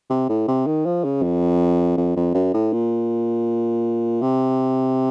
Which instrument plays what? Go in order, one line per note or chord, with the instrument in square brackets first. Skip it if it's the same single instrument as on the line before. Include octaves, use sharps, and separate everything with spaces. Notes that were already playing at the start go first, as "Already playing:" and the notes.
[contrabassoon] C3
A2
C3
D#3
F3
C#3
F2
F2
F2
F#2
A2
A#2
C3